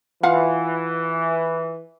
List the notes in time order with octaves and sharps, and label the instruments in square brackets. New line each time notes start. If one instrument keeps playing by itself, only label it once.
[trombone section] E3 [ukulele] F4 F5 F#5